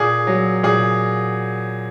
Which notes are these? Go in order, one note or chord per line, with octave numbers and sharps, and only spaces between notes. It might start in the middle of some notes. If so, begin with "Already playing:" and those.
Already playing: A#2 G#4
F#3
A#2 G#4